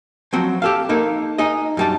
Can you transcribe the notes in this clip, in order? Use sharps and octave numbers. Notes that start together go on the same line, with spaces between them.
F3 F#3 C4 F#4
G4 A4 F5
A#3 D#4 A4
D#4 G#4 D#5
F#2 G3 A5